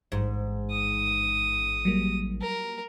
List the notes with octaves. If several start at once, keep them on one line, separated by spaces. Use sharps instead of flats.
A1 G#2
D#6
F#3 G3 A#3
A#4